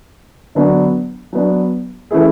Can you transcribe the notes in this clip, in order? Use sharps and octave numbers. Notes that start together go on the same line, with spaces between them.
D3 F#3 B3 D4
F#3 B3 D4
E3 A3 C#4 E4 G#4